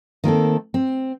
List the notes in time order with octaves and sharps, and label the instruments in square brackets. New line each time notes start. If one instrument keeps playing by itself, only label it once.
[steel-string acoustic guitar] D#3 A#3 C4 A4
C4